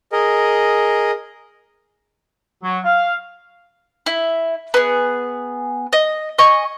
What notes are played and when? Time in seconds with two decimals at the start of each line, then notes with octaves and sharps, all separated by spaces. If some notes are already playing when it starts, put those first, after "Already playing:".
0.12 G#4 A#4 D#5
2.64 F#3
2.85 F5
4.06 E4
4.74 B3 G#4
5.93 D#5
6.38 D#5 G#5 C#6